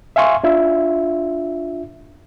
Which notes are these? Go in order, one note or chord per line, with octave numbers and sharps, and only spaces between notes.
E5 F5 G#5 C6 C#6
D4 F4 E5